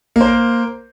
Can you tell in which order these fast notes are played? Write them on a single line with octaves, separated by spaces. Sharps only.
A#3 C5 A#4